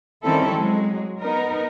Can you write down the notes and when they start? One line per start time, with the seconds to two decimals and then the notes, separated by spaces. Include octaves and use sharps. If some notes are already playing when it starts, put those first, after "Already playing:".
0.23 D#3 G3 C4 C#4 E4 A4
0.54 F#3 G#3
1.19 B3 D#4 A#4